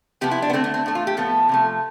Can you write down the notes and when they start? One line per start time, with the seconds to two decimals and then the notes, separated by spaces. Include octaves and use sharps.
0.21 C3 F3 B3 G4
0.31 E4
0.42 D4
0.50 B3
0.53 D3 A3 C4
0.64 B3
0.74 C4
0.86 A2 E3 A3
0.95 F4
1.07 G4
1.17 A2 F3 B3 A4
1.49 C3 F3 A3